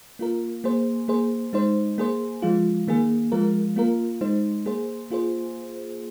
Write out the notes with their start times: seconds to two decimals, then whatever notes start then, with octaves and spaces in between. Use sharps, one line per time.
0.19 A#3 F4 A#4
0.64 A#3 G#4 C5
1.08 A#3 G#4 C5
1.53 G#3 D#4 C5
1.98 A#3 G#4 C5
2.42 F3 G#3 F4
2.87 D#3 A#3 G#4
3.32 F3 G#3 F4 A#4
3.76 A#3 F4 A#4
4.21 G#3 D#4 C5
4.66 A#3 G#4 C5
5.10 A#3 F4 G#4 C5